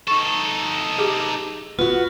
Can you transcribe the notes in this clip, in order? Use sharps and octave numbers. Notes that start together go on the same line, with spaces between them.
D#4 A4 C#6
G4 G#4 D6
B3 F4 F#4